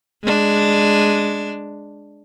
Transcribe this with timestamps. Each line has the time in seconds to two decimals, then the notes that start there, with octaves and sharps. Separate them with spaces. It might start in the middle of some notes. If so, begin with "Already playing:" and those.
0.24 G#3 D4